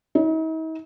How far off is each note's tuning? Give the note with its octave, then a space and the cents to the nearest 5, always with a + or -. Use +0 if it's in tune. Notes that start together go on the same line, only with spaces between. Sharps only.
D#4 +45